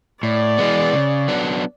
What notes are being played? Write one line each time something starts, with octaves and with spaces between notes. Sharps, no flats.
A2 D5
E3 G#3 B3
C#3
F#3 B3 D4